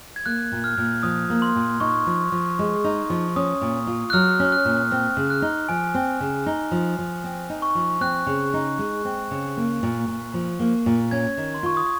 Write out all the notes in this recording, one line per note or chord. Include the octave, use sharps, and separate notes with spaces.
G#6
A#3 F#6
A#2
F6
A#2
F3 D#6
A#3
C6
A#2
D#4 C#6
F3
F3
G#3
D#4
F3
C#4 D#6
A#2
F4
F#6
F#3 F6
C#4
F6
F#6
A#2
C4 F6
C#3
F#6
D#4
F3 G#5
C4
C#3
D#4
F3
F3
C4
D#4
C#6
F3
C4 F#6
C#3
D#4
G#3
C4
C#3
A#3
A#2
A#2
F3
A#3
A#2
C#4 G#6
D#3
C6
F4 C#6
D#6